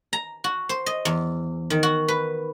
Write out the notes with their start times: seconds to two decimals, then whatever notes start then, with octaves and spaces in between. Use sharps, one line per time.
0.13 A#5
0.44 F#4
0.69 C5
0.86 D#5
1.05 E2
1.70 D#3
1.83 F#4
2.08 B4